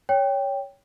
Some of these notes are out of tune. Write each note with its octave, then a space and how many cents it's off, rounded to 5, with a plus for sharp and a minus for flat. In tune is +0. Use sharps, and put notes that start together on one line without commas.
C#5 +15 G5 +5